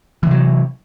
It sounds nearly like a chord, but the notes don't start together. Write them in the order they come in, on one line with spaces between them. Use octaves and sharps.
E3 C3 F#3